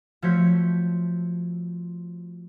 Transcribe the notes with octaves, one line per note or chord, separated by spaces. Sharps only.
F3 A3 F#4 C#5 G6 B6